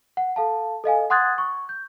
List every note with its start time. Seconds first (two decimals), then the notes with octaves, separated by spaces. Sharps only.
0.17 F#5
0.36 A4 F5 A5
0.84 A4 D#5 F5 G#5
1.10 F#5 C6 D#6 F#6 G#6 A6
1.38 C#6
1.69 G6